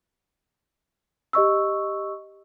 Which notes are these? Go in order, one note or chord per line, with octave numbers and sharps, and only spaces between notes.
G4 D#5 C#6 E6